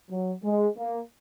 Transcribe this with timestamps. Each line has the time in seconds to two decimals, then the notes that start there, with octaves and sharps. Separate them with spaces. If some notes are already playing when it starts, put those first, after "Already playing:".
0.10 F#3
0.44 G#3
0.77 A#3